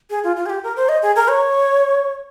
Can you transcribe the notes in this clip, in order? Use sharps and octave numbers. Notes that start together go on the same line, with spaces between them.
G#4
F4
F4
G#4
G4
A#4
C5
D#5
G#4
A#4
C#5